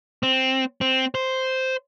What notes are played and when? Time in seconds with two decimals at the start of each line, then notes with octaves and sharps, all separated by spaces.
0.23 C4
0.81 C4
1.15 C5